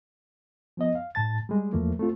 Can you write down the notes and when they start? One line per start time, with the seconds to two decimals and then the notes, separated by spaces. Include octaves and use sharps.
0.77 F3 B3 D#5
0.95 F5
1.15 A2 A5 A6
1.49 G3 G#3
1.73 E2 F3 A3 A#3
1.99 A3 C4 F4